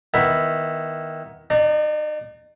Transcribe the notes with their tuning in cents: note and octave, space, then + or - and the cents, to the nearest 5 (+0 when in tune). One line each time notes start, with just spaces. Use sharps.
D#3 +10 B3 +0 E4 +0
D#4 -40 D5 +0